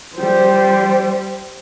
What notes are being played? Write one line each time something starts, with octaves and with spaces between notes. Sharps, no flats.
G3 C5